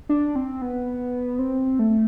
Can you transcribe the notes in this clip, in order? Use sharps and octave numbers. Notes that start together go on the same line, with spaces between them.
D4
C4
B3
C4
A3